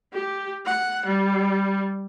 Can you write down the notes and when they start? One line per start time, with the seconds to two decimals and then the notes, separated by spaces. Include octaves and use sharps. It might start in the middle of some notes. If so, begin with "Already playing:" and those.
0.13 G4
0.65 F#5
1.06 G3